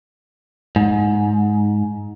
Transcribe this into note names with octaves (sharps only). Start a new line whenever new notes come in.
G#2